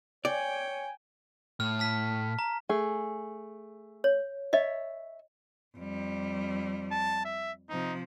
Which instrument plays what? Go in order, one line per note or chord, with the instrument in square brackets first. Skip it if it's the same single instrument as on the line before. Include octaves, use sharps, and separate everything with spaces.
[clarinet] C#5 [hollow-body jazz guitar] D5 [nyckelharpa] G5 [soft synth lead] G#5
[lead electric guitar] A2 [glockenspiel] F6
[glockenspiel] A5 F6 B6
A#5
[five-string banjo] A3 G#4
[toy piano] C#5
[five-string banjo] C#5 E5 [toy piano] D#5
[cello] F2 G3
[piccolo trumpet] A5
E5
[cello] C3 F3 [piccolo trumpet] D#4